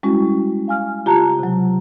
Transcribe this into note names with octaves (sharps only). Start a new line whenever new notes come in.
G3 G#3 C#4 E4 F#4
F5 G#5 F6
C#3 F4 G4 A5 A#5 F#6
C3 F#3